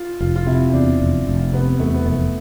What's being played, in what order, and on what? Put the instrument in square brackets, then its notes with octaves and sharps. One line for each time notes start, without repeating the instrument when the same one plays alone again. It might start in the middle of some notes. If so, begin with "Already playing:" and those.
Already playing: [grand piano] F4
[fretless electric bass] F1 [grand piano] F4
[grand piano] F4
[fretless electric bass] C3 [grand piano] E4
[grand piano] C4
[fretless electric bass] E2 [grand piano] D4
[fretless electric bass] F1
F1
[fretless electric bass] C3 [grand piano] B3
[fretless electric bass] E2 [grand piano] A3
[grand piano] B3
[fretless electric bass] F1 [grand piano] A3